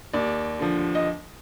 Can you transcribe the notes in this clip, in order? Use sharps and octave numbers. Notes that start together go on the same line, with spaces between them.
D#2 D5
D3 F3
D#5